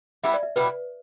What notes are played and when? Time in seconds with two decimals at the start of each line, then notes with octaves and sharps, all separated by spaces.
0.24 G3 B3 E4 E5
0.34 D5
0.43 E5
0.56 B2 G3 E4 B4